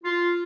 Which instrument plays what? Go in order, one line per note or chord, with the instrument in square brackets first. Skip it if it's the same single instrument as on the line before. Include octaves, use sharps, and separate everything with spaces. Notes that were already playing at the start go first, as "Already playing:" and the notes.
[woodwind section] F4